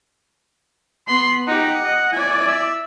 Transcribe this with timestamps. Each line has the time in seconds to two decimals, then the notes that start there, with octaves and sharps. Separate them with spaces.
1.08 B3 B5 C6
1.47 D#4 G4 F#5
1.82 D#5
2.13 E4 D5 G#5
2.47 E5